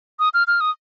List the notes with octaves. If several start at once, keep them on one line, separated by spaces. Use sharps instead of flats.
D#6
F6
F6
D#6